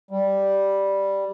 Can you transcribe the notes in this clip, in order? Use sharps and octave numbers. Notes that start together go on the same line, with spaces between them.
G3